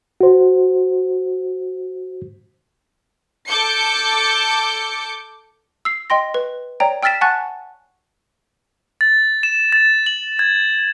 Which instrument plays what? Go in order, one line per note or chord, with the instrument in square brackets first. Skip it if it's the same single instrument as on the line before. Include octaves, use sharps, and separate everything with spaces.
[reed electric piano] F#4 C5
[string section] A4 D6 G6 C#7
[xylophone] E6 C7
D#5 G5 C6 A#6
B4
C#5 D5 G5 A#5
G5 E6 F6 A6 B6 E7
F#5 G#5 A5 C#6 F#6 A6
[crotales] A6
E7
A6
F#7
G#6